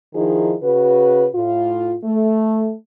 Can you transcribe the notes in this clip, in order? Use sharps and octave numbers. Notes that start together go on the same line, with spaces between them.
D#3 F3 D#4 E4 G#4
C#3 F#4 B4
A2 F4
A3